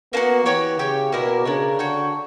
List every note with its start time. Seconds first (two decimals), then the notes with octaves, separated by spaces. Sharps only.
0.13 A#3 B3 D4 F#4
0.45 E3 G4 C#5 F#5
0.79 C#3 G4 C#5 G5
1.12 B2 A#3 E4 A#4 D5
1.45 C#3 D4 A#4 C#5
1.78 D3 F#4 C#5 G5